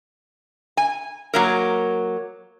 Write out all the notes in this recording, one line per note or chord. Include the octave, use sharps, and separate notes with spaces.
G#5
F#3 A#3 A#4